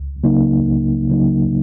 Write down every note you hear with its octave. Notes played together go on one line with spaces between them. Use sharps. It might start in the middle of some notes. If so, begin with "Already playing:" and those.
Already playing: C#2
C#3 F#3 A#3 D#4
C#2
C#3 F#3 A#3 D#4